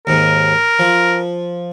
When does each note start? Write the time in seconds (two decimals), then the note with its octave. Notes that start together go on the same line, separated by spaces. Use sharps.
0.07 D#2 G#2 A#4
0.79 F3